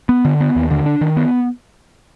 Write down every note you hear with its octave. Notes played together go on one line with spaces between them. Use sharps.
B3
D3
B3
D#2
D3
D4
D#3
B3